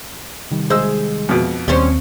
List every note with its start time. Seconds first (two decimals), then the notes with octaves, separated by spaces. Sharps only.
0.50 C3 D#3 G3
0.70 G#3 C5 E6
1.29 F2 B2
1.68 D#2 G3 C4 C#4 C5 C#6